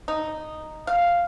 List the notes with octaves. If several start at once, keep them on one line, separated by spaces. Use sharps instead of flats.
D#4
F5